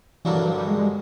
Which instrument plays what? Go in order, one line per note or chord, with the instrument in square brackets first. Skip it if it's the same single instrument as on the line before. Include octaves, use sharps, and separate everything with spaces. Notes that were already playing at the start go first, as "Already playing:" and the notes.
[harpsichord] G2 D3 F#3 A#3 D4 [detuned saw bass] E3
[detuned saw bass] E3
F3
G3
G#3
G#3